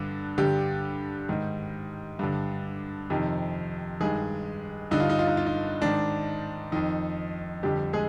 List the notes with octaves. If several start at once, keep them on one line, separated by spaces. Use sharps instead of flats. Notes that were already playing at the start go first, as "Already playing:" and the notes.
Already playing: G2 D3
G2 D3 G3 G4
G#2 D#3
G2 D3
F2 C3 D#3
G2 D#3 G#3 G#4
G2 D3 D#4
F4
D#4
F4
D#4
F4
D#4
G#2 D#3 D4
F2 D#3 D#4
F2 D3 G3 G4
G#3 G#4